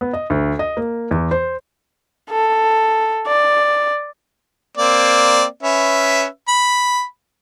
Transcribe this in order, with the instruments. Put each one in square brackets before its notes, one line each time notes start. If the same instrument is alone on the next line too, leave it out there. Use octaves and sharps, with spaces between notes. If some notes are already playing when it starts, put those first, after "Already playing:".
[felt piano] B3
D#5
D2
D#5
A#3
E2
C5
[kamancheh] A4
D5
[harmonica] A#3 C4 D5
C#4 B4 E5
B5